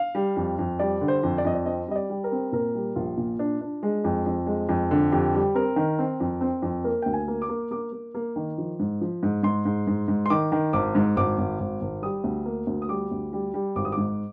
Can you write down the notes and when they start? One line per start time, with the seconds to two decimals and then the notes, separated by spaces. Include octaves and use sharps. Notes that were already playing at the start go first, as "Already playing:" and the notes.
Already playing: F5
0.15 G3
0.36 F2
0.59 F2
0.79 G3 D5
1.01 D3
1.08 C5
1.23 F2
1.38 D5
1.45 F2 D#5
1.54 D5
1.66 C4 D#5
1.88 G3 D#5
1.96 D5
2.10 G3
2.24 A#4
2.32 C4
2.52 A#2 A#4
2.75 G3
2.96 A#1 F4
3.17 A#2
3.39 D4
3.61 D4
3.83 G#3
4.04 F2
4.26 F2
4.47 G#3
4.69 F2
4.91 D3
5.12 F2 G4
5.34 G3
5.55 C4 A#4
5.76 D#3
5.99 C4
6.20 F2
6.41 C4
6.62 F2
6.84 A#3 A#4
7.02 D2 G5
7.13 G#5
7.28 A#3
7.42 D6
7.49 A#3
7.71 A#3 D6
7.92 A#3
8.14 A#3
8.36 D#3
8.58 F3
8.80 G#2
9.01 F3
9.23 G#2
9.43 G#2 C6
9.65 G#2
9.87 G#2
10.08 G#2
10.26 C6
10.30 D#3 D6
10.52 D#3
10.73 G#1 D6
10.95 G#2
11.17 G#1 D6
11.38 G#1
11.60 G#1
11.81 G#1
12.02 G3 D#6
12.24 D2
12.45 A#3
12.67 D2
12.82 D#6
12.89 G3 D6
13.11 D2
13.33 G3
13.54 G3
13.76 G#1 D6
13.85 D#6
13.92 D6
13.97 G#2